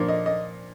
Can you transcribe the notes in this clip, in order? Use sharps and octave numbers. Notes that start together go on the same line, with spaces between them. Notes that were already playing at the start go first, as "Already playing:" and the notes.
Already playing: A#2 F3 A#3 D4
D#5
D#5